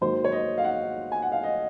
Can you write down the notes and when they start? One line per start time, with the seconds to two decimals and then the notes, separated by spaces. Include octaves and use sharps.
0.01 G#2 D#3 F#3 A#3 C5
0.24 C#5
0.32 D#5
0.58 F5
0.64 F#5
1.12 G#5
1.22 F#5
1.32 F5
1.43 D#5